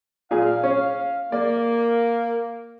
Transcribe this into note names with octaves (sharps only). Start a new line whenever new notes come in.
A#2 G#4 F5
C#4
A#3 D5